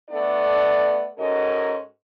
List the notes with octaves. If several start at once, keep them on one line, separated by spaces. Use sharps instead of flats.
A3 B3 D4 A4 D5
G#2 C#4 F#4 A4 A#4 D#5